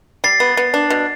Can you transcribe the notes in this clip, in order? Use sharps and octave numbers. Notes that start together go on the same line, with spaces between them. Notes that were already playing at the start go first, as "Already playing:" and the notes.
G3 A6 C7
B3
B3
D4
B2